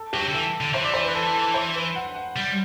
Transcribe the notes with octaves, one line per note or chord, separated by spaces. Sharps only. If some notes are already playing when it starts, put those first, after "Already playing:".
Already playing: A4
F#3 G4
D3
E3 A4
D3
E3 C5
D5
C5
B4
A4
A4
C5
B4
F#5
F#5
G3